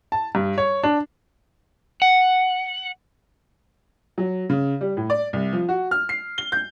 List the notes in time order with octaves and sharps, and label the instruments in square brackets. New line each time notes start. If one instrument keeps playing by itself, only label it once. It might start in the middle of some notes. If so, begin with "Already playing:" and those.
[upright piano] A5
G2
C#5
D4
[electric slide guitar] F#5
[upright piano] F#3
C#3
G3
A2
D5
C2
F3
F#4
F6
C7
G7
G6